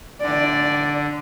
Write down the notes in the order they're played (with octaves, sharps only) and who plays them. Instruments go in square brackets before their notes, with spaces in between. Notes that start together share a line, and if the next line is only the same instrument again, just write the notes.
[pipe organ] D3 [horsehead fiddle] D5